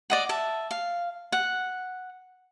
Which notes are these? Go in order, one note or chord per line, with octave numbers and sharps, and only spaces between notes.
D5 D#5 F#5
E5 A5
F5
F#5